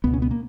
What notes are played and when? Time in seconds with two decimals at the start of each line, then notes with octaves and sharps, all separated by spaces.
0.04 C#2 B2 B3
0.13 C#4
0.22 B3
0.31 A#3